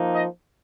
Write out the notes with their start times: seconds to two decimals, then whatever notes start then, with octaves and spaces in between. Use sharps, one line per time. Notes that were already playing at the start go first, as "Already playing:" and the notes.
Already playing: F3 A#3 D#4
0.14 D#5